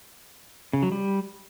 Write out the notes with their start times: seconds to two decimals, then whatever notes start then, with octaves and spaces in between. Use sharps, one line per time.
0.73 C#3
0.83 F#3
0.92 G3